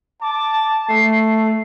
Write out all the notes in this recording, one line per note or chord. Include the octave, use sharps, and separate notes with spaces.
A5 D6
A3 C7